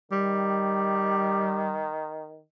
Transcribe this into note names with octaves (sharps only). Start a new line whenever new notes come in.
D#3 G3